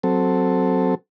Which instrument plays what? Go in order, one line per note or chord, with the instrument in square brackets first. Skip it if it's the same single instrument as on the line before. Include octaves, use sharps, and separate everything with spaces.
[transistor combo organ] F#3 C4 A4